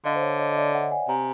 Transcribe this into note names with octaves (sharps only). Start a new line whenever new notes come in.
D3 D#5 F5
C5
C#5
C#5 D#5
D#5
D5 E5
E5 F#5
F#5 G#5
C3 G#5 A#5